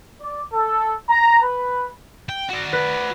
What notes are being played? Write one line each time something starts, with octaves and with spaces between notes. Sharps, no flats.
D5
A4
A#5
B4
G5
F#4 D5
B4